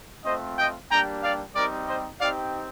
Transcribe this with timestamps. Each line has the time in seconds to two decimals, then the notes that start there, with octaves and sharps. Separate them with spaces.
0.25 A3 C4 F4 C5 D#5
0.59 D#5 G5
0.91 G3 A#3 D4 G4 G5 A#5
1.23 D5 F5
1.55 G3 C4 D#4 G4 A#4 D5
1.88 C5 D#5
2.20 C4 D#4 G4 D5 F5